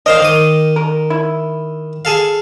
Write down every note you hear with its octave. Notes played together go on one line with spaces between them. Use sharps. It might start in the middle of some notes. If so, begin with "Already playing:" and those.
A#4 C5 D#5 F5
D#3 D6 D#6
A#4
E4
G#4 A4 F5